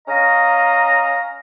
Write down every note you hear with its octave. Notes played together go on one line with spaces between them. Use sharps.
C#4 D#5 F5 A#5